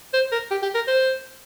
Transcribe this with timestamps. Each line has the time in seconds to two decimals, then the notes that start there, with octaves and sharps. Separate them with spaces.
0.14 C5
0.32 A#4
0.51 G4
0.63 G4
0.75 A#4
0.88 C5